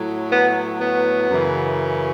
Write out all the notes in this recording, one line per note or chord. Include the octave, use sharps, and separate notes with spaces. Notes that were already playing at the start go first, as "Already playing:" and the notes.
Already playing: A2 F#3
B3
B3
F#2 C#3 E3